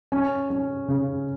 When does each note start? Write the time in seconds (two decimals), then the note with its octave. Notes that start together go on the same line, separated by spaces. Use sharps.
0.12 C#4
0.50 C#4
0.88 C#3